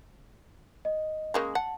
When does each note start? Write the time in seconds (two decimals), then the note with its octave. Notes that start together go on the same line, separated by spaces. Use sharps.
0.85 D#5
1.34 C#3 G#3 A#3
1.55 F#5 A5